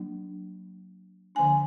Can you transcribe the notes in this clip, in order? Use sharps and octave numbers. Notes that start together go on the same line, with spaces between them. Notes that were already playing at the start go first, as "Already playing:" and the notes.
Already playing: F#3 A#3 D4
D3 F3 A#3 D4 G#5